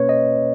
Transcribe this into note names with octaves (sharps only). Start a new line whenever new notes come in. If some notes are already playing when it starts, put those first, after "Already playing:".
Already playing: B2 A#3 C#4 B4 C#5
D#5